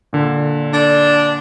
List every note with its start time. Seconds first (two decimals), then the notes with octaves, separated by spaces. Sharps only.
0.13 A#2 D3
0.73 D4